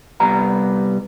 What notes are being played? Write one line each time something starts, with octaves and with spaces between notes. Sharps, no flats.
C2 G3 B3 A#5